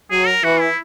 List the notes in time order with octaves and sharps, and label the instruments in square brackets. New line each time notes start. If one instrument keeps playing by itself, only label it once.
[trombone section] F#3 [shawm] G#4
[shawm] A#4
[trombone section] E3 [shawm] F#4
[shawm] E4